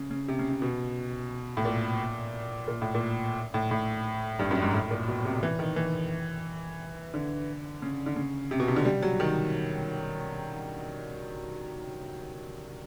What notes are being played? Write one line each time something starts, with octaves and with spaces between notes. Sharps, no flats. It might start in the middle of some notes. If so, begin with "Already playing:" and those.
Already playing: C#3
C#3
C3
C#3
C3
B2
A2
A#2
A#2
A2
A#2
A2
A2
G2
F#2
G#2
A2
A#2
B2
C3
E3
D#3
E3
D3
C#3
D3
C#3
C3
B2
C3
D3
G3
F#3
D#3